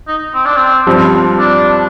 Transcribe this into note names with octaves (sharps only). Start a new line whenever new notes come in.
D#4
C4
D4
C4
G2 F3 C4
D4